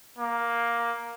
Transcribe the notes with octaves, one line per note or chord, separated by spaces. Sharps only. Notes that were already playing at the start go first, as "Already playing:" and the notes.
A#3